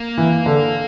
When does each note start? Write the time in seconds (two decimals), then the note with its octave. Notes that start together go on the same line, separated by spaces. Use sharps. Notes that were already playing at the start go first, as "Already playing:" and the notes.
Already playing: A#3
0.18 E3
0.46 D3